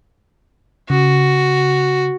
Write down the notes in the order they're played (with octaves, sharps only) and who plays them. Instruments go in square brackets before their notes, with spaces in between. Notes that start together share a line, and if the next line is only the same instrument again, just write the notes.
[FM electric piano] C#3 [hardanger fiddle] F#4